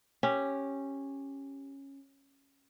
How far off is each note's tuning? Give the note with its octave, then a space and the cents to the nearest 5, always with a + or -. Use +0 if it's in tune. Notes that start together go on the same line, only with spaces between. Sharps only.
C#4 -10 G4 +0